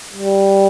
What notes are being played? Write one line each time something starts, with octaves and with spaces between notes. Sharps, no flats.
G3